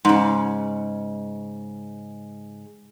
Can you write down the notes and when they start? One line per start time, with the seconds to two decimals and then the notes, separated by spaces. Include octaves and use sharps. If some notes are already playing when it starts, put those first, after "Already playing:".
0.05 G#2 C#3